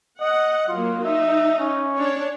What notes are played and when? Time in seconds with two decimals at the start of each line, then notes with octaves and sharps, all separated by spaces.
0.21 D#5 F#5
0.69 F#3 A#3 F4
1.04 D#4 E5
1.59 C#4
1.97 D4 C#5